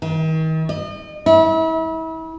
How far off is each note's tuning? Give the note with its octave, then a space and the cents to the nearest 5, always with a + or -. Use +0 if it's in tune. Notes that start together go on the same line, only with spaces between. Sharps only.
D#3 +40
D#5 -35
E4 -35